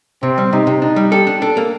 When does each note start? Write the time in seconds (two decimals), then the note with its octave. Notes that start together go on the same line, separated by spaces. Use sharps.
0.22 C3 C4
0.38 G3
0.53 C3 D#4
0.67 C3
0.82 D4 D#4
0.96 G3
1.12 G4 A4
1.27 D4
1.42 D4 A4
1.57 A#3